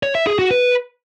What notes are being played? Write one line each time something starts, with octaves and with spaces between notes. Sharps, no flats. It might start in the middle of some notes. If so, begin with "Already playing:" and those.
C#5
E5
G#4
F#4
B4